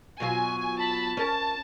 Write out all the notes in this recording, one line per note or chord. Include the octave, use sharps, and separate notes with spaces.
B2 F#3 F4 G#5
A5 B5
C#4 A#4 A5